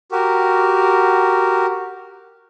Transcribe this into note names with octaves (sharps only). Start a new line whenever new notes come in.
F#4 G4 A#4